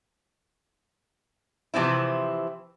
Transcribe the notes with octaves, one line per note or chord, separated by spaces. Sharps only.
C3 E3 F3 C4 E4